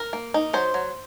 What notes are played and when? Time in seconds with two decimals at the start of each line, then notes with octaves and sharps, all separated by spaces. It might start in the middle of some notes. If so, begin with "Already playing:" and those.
Already playing: A#4
0.13 A#3
0.34 D#4
0.53 F#3 C5
0.74 F#3